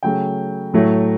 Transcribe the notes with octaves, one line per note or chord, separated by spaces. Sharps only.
C#3 F#3 A3 G5
A2 F#3 A3